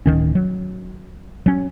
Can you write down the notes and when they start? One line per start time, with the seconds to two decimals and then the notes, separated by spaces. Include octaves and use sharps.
0.06 D1 C2 D#3 C#4
0.35 F#3
1.46 F#3 C#4